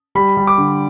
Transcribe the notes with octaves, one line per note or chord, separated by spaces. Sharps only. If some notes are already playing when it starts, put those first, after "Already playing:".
G3 B5
G3
D6
D3